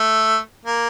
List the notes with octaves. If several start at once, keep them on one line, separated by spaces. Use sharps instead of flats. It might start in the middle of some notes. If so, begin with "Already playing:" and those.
Already playing: A3
A#3